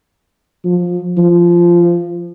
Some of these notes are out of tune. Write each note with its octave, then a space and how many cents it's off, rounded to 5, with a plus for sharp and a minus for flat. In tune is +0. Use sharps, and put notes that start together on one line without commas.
F3 +20
F3 -15